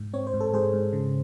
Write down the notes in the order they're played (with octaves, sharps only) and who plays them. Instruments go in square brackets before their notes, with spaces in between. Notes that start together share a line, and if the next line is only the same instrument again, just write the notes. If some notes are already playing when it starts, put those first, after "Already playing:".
Already playing: [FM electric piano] G#2
C4 C#5
C5
G#2
A4
G#2 G#4 C5
G#2
C#3